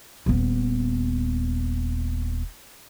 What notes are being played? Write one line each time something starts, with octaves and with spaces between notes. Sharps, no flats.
D#1 B3